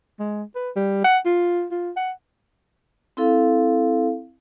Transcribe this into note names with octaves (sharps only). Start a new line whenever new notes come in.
G#3
B4
G3
F#5
F4
F4
F#5
C4 E4 A4 F5